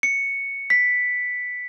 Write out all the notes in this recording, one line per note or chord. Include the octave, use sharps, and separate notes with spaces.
C#7
B6